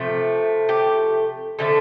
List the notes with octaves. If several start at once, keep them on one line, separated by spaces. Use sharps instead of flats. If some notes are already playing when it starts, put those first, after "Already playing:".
Already playing: C3 F3 A3
G4
D3 F3 A3 A4